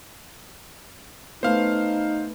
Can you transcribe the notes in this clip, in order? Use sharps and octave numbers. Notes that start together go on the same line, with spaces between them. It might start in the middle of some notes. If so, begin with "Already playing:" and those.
A3 B3 D#4 C5 F5